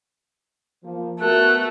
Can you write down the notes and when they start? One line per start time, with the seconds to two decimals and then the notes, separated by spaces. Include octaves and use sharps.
0.84 F3 A#3 F4
1.20 A3 B3 F#4 A#4 F#6